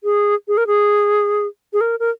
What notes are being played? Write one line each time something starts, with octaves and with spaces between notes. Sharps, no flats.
G#4
G#4
A#4
G#4
G#4
A#4
A#4